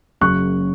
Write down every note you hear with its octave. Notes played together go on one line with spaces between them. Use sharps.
F#1 F#2 C#3 C#6 F#6